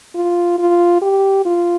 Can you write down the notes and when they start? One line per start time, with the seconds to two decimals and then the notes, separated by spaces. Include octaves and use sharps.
0.15 F4
0.58 F4
1.02 G4
1.45 F4